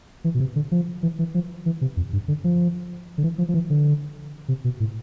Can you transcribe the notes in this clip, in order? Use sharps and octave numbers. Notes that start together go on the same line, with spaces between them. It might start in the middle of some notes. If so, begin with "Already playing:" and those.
E3
B2
C3
D3
F3
E3
E3
F3
E3
C3
F2
G2
D3
F3
D3
E3
F3
F3
E3
D3
C3
B2
A2